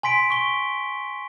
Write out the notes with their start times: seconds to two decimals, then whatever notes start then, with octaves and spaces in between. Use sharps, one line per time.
0.03 G#5 C6 B6 D7
0.30 C#6 G7